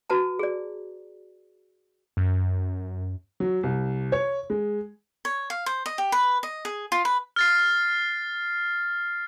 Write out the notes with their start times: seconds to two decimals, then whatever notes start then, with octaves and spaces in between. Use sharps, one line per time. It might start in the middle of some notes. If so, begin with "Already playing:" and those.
0.10 F#4 B4 A5 A#5
0.39 G#4 D5
2.17 F#2
3.40 F#3
3.63 C2
4.12 C#5
4.50 G#3
5.25 C#5
5.50 F5
5.66 C5
5.86 D#5
5.98 G4
6.12 B4
6.43 D#5
6.65 G#4
6.92 F4
7.05 B4
7.36 F6 A6 C7